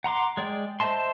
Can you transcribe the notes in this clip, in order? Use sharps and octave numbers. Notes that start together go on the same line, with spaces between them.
F#5 A#5 C6 D6
G#3 D5 G5
C5 D#5 E5 A5 C6